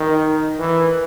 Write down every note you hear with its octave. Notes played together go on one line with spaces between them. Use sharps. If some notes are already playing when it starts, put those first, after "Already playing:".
Already playing: D#3
E3